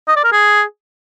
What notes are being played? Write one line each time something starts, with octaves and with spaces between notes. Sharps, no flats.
D#5
D5
A#4
G#4